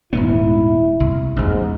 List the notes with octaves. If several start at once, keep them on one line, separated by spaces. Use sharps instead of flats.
D#1 G#2 B3 E4
C2
A1 E2 G#2